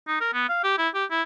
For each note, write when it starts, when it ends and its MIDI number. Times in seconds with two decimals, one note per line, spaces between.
0.08 0.20 63
0.21 0.30 70
0.34 0.48 59
0.49 0.59 77
0.64 0.75 67
0.78 0.88 64
0.95 1.05 67
1.11 1.23 64